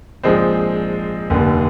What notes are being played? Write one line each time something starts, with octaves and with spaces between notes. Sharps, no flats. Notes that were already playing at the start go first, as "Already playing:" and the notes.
A#1 G#2 F3 G#3 C4
F1 D#2 D3 G3